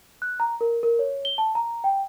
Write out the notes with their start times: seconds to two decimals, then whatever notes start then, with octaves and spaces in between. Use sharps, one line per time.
0.22 F#6
0.40 A#5
0.61 A#4
0.83 A#4
0.99 C#5
1.25 G7
1.38 A5
1.55 A#5
1.84 G5